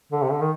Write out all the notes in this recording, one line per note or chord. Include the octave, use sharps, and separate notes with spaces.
D3
C3
D3
D#3